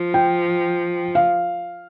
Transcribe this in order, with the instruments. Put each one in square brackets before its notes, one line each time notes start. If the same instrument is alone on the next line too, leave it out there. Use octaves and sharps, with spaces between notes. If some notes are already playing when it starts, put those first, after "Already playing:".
Already playing: [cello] F3
[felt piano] G5
F5